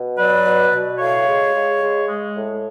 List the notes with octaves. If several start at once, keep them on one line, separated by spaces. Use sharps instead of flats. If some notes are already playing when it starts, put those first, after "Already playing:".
Already playing: B2
F#3 B4 D5
B2
B2
A2 C#5 F5
G#3
G#3
G#3
G#3
A2